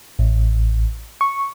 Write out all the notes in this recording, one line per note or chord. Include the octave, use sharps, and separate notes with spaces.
A1
C#6